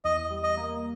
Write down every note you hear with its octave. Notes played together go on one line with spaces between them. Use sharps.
E2 D#5
G3
D#5
A#3